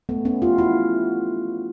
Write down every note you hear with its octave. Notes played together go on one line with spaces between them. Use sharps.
A3 B3
B3 C#4
F4 G4
E4 F#4